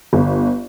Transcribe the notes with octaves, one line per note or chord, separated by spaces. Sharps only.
G1